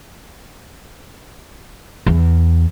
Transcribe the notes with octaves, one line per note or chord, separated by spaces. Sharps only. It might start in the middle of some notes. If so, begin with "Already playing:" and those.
E2